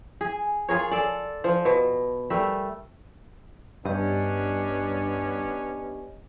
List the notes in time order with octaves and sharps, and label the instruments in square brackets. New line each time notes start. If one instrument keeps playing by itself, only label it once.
[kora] G#4
F4 G#4 A#4 C#5
A4 D5
F3
B2
G3 A3 A#4 E5
[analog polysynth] G2 [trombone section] B3 C#4 D4 [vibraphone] G4 D#5